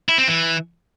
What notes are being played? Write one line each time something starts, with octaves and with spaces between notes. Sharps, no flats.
E4
C4
E3